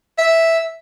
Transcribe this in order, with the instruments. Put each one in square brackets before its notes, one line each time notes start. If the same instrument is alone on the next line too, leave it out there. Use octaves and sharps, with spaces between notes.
[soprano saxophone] E5